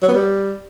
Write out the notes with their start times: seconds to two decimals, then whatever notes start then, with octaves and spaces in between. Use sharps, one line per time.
0.02 F#3
0.08 B3
0.14 G3